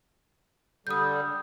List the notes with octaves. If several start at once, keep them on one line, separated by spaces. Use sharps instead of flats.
D3 G3 D#6 G6